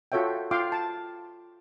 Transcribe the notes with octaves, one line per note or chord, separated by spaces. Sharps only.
F4 F#4 A4 C#5 E5 G5
F4 F5 G5 C6 D6
A5